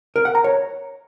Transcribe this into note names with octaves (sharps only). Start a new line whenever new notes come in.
A#4
F#5
A#5
C#5